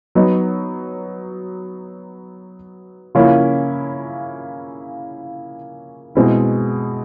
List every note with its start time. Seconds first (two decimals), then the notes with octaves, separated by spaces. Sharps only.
0.15 F#3 B3 D#4
3.15 C#3 F3 A#3 C#4 E4
6.15 B2 G#3 C4 E4